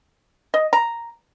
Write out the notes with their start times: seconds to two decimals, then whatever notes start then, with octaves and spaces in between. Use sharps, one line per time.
0.54 D#5
0.73 A#5